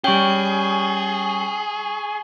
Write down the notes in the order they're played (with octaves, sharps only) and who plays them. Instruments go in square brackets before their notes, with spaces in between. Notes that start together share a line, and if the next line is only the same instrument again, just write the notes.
[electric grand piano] G3 C#4 [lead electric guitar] G#4 [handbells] G5 [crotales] C#6 F#7 G7